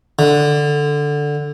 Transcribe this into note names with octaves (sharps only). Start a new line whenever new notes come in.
D3